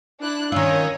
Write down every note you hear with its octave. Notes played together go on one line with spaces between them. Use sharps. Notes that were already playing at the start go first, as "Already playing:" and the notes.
D4 E4 F#6
D#3 C#4 F4 C#5 D#5 E6